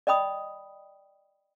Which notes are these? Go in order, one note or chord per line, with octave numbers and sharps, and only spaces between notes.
D5 D#5 G5 B5 D#6